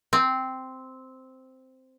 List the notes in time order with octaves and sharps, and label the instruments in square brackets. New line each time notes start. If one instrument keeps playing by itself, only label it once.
[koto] C4